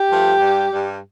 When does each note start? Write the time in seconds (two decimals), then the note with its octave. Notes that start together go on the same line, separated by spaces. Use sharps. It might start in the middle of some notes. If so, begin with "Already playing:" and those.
Already playing: G4
0.09 G2 F3 A3
0.40 G2 G3
0.72 G2 G3